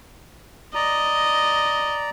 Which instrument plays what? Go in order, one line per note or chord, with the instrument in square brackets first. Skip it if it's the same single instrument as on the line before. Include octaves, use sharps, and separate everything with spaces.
[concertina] D5 A#5 [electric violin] D#5